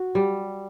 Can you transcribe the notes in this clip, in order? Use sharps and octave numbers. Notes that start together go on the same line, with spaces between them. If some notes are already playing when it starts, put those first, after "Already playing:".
Already playing: F#4
G3